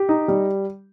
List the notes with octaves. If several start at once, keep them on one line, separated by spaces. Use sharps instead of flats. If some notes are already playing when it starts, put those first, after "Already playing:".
Already playing: G4
D#4
G3